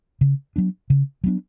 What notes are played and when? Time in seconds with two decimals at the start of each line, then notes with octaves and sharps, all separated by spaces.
0.21 C#3
0.56 F#3 B3 D4
0.90 C#3
1.24 F#3 B3 D4